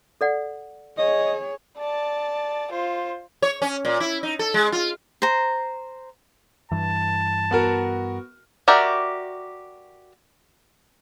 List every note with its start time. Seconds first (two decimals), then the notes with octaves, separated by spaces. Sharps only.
0.21 A4 D5 F#5
0.98 G#4 C#5 D#5
1.78 D5 A5
2.71 F4 C5
3.42 C#5
3.62 C#4
3.85 A#2
4.00 E4
4.23 D#4
4.39 A4
4.54 G#3
4.72 F4
5.22 C5 A#5
6.72 G2 E3 A5
7.51 B3 F#4 A#4
8.68 F#4 G4 A#4 D5 E5